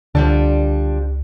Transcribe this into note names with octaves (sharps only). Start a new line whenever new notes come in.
C#2 D3 F3 G3 D4